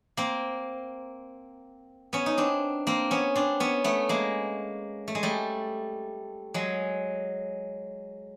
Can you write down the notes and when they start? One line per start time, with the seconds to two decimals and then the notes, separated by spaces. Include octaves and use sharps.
0.17 A#3 C4
2.13 B3 C#4
2.26 D#4
2.38 C4 D4
2.87 A#3 C4
3.11 B3 C#4
3.35 C4 D4
3.60 B3 C#4
3.84 A3 B3
4.09 G#3 A#3
5.08 A3
5.15 G#3
5.23 G3 A3
6.54 F#3 G#3